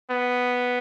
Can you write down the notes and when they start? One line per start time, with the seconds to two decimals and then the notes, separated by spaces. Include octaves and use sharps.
0.11 B3